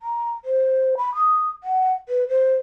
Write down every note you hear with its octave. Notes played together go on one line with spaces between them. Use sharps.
A#5
C5
B5
D#6
F#5
B4
C5